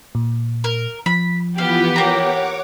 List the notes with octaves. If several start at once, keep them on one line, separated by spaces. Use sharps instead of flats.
A#2
A#4
F3 B5
E3 B3 F4 G4 F5
A#3 C#5 F#5 A#5 D6